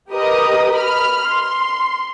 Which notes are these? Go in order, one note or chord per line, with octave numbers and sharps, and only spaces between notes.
G4 A#4 B4 D#5 A#5 D#6
B5 F6
C6